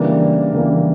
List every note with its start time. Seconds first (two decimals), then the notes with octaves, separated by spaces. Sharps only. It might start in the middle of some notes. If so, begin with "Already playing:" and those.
Already playing: C#3 E3 G3 A#3 D4
0.53 C#3 E3 G3 A#3 D4